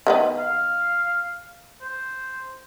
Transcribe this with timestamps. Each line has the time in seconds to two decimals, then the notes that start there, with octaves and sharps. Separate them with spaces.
0.07 D#3 A3 B3
0.38 F5
1.81 C5